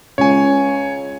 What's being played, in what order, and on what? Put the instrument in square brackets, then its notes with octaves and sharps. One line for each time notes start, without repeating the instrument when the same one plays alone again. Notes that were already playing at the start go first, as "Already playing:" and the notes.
[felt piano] C#2 [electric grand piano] C#5 G#5